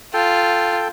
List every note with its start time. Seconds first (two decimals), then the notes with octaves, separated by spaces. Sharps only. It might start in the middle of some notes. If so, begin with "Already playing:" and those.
0.14 F4 A4 G5